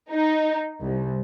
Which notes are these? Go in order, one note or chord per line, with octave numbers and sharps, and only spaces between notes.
D#4
C2